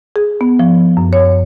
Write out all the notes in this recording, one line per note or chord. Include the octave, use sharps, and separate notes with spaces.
G#4
B3
F3
F#2
C#5